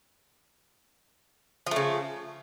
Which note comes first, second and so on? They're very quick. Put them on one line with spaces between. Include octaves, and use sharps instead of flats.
F3 A3 C#3